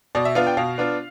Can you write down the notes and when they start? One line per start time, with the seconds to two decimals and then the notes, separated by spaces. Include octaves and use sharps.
0.15 B2 D5
0.25 E5
0.35 B3 D4 F4 F5
0.47 G5
0.57 B2 F5
0.78 B3 D4 F4